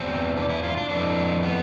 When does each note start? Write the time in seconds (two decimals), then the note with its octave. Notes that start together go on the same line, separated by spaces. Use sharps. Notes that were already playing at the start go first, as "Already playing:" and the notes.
Already playing: E2 B2 C4
0.37 D4
0.49 E4
0.63 F4
0.77 D4
0.89 F2 E3 D4
1.43 B3